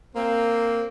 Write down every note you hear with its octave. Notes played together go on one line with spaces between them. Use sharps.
A#3 C4